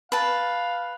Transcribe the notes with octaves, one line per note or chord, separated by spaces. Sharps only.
B4 F5 A5